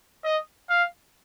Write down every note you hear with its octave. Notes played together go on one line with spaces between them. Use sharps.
D#5
F5